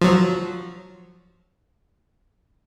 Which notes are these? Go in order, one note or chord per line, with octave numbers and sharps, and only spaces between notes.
F3 F#3